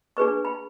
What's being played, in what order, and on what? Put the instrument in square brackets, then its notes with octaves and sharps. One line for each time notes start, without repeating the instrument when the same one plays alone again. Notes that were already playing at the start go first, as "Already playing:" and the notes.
[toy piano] D4 G#4 B4 C#6
B5